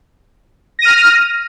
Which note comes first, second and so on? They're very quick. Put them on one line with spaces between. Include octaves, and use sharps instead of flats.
A#6 D#7 F6